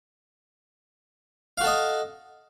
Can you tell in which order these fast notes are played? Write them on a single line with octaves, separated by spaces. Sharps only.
F5 F#4 A4 D#5